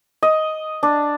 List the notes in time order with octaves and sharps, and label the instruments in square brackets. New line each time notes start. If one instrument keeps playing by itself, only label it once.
[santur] D#5
D4